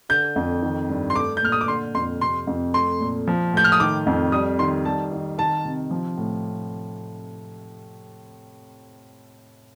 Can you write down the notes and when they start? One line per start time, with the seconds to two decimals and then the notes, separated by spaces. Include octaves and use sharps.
0.09 D3 G6
0.36 F2
0.62 D#3
0.89 G2
1.10 C6
1.15 A3 D6
1.37 G6
1.43 A#2 F6
1.52 D#6
1.61 D6
1.68 D3 C6
1.95 F2 C6
2.21 C3 C6
2.47 F2
2.74 A3 C6
3.00 A#2
3.27 F3
3.53 A2 G6
3.64 F6
3.72 D#6
3.80 D#3 D6
4.07 F2
4.32 G3 D#6
4.59 D#3 C6
4.85 G3 A5
5.12 D#3
5.38 D#3 A5
5.65 C3
5.91 F3
6.18 A2